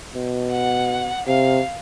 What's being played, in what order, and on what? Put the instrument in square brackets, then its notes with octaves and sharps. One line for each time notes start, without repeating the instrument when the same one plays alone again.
[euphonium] B2
[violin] F#5
[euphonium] C3 [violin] F5